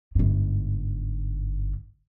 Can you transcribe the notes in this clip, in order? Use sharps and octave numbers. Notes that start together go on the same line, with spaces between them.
G1 G#2